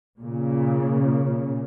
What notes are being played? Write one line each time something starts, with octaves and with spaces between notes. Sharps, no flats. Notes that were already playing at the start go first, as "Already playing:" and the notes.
A#2 C#3